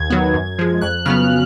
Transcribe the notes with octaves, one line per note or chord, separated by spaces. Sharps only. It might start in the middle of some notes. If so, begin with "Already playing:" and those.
Already playing: D#2 G#6
D#3 F#3 B3
F#2
F3 G#3
F2 F#6
C#3 F#3 B3 F6